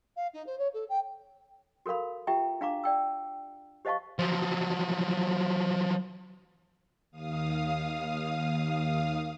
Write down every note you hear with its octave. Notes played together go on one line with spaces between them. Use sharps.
F5
D#4
C5
C#5
A4
G5
F#4 A4 A#4 F5 B5
F4 G4 E5 G5 A#5
D4 F5 A#5 D6
D5 G5 E6
G4 C5 D#5 F5 A5 C#6
F3 F#3
D#2 F5 D#6